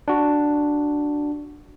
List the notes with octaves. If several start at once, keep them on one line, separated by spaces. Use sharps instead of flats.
D4 F#4